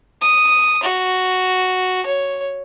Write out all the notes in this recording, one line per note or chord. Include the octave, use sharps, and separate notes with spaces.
D#6
F#4
C#5